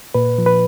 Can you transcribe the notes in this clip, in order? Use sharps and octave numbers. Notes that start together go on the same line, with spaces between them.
A#2 B4
F3
B4